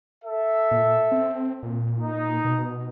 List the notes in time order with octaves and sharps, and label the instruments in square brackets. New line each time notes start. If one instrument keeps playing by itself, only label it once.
[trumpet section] A4 E5
[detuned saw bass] A#2
C4
A#2
[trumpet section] D#4
[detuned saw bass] B2